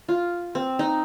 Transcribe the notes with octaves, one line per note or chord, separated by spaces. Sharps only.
F4
C4
D#4